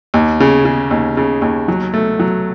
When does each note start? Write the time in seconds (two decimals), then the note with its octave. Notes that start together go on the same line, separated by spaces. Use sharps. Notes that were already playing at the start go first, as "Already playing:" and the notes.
0.14 D#2
0.40 C#3
0.65 C#3
0.91 D#2
1.17 C#3
1.42 D#2
1.68 F#3
1.94 A3
2.19 F#3